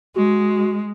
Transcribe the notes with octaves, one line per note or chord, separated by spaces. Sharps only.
G#3 F#4